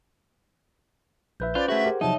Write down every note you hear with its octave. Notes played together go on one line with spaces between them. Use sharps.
A#1 B4 E5 G6
C#4 F4 B4 C5 D5
A3 F#4 G#4 E5 F#5 G#6
G4 A#4 C5
C3 F3 F#3 D#4 C#5 E5 A5